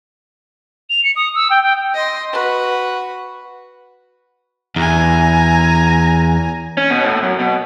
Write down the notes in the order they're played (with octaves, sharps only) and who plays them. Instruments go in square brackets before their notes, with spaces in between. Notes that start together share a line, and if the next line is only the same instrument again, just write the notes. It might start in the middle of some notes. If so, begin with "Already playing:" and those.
[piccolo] F7
C#7
D#6
E6
G5
G5
[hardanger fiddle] D#5 C6
F#4 B4
[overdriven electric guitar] E2 [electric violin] G#5 A#5
[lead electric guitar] C#4
B2
A2
F#2
B2